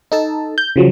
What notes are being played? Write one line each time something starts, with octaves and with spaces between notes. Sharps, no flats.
D#4 A4 A5
G6
C#3 F3 F#3